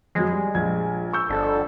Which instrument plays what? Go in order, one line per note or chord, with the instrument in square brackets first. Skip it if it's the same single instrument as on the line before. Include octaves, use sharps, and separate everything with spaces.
[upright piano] F2 F#3 [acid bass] G#3
[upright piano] G3
A#1 G#6
C#6 E6 G6
[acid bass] G1 [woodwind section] F2 D3 [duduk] A4